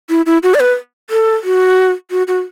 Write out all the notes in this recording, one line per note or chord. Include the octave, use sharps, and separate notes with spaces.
E4
E4
F#4
D5
B4
A4
F#4
F#4
F#4